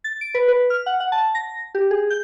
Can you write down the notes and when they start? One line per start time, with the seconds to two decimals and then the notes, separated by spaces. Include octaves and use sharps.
0.04 A6
0.21 D7
0.34 B4
0.48 B4
0.70 F6
0.86 F#5
1.00 F#5
1.12 A5
1.35 A#6
1.75 G4
1.91 G#4
2.10 G6